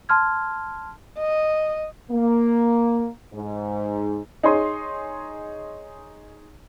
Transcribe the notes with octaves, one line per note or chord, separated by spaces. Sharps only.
A5 C6 F6 G#6
D#5
A#3
G#2
D#4 G#4 C#5 C6 D#6